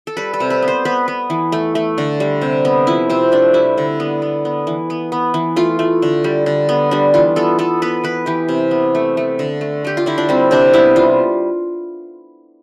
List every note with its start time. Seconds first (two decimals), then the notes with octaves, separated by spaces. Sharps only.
0.07 A4
0.17 G3 B4
0.34 A4
0.40 C3
0.50 B4
0.62 B3
0.68 C5
0.85 B3 B4
1.08 B3
1.30 E3
1.52 A3
1.75 A3
1.98 D3
2.20 G3
2.42 C3
2.65 B3
2.87 F3 E4
3.10 C3 C4
3.32 A3 D4
3.54 G3 E4
3.78 D3
4.00 B3
4.22 B3
4.45 B3
4.67 E3
4.90 B3
5.12 B3
5.34 E3
5.56 A3 F4
5.79 A3
6.02 D3
6.24 G3
6.46 D3
6.69 B3
6.91 G3 D4
7.14 E3 F4
7.36 B3 A4
7.59 B3 A4
7.82 B3 B4
8.04 E3 B4
8.26 E3 G4
8.49 C3
8.71 B3
8.95 A3
9.17 A3
9.39 D3
9.61 A3
9.84 A3 G4
9.97 F4
10.06 D3 E4
10.18 D4
10.29 G3 C4
10.51 C3 D4
10.74 B3 E4
10.96 G3 F4